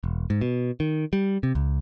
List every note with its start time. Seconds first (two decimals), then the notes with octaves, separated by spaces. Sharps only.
0.04 E1
0.30 G#2
0.41 B2
0.80 D#3
1.13 G3
1.43 C3
1.55 C#2